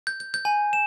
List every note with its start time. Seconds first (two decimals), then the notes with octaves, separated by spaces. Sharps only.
0.07 G6
0.20 G6
0.34 G6
0.45 G#5
0.73 E7